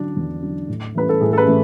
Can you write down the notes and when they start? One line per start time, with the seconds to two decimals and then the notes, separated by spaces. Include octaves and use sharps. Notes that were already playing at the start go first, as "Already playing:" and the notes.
Already playing: D3 F#3 D4
0.17 E2
0.42 D3 F#3
0.68 A2
0.95 E3 A3 C#4 B4
1.09 A4
1.21 A2 G#4
1.33 A4
1.38 B4
1.46 E3 A3